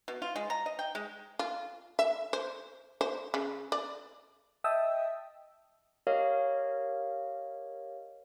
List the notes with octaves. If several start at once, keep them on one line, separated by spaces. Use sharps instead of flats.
B2
F4
G#3
A#5
D#5
G5
G#3
F4
E5
C5
C5
C#3
D5
D#5 E5 G5 A5 D#6 E6
G4 A#4 C#5 D#5 F5